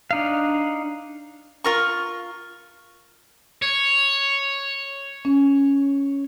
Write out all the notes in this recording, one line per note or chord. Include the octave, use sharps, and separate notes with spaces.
D4 D#4 F5
F4 A#4 C#6
C#5
C#4